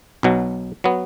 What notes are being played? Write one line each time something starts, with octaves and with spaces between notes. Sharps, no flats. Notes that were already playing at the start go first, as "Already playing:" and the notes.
B1 B2 F#3
F#3 B3